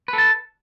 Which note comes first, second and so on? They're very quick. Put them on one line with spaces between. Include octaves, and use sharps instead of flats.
B4 A4 A5